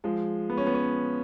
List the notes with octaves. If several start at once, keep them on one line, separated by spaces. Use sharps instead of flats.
F3 G#3
B3
C#4
B3
C#4